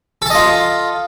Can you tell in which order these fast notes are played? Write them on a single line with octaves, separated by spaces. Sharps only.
A4 A5 D#5 F4